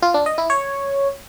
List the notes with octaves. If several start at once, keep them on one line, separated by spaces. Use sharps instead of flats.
F4
D4
D#5
E4
C#5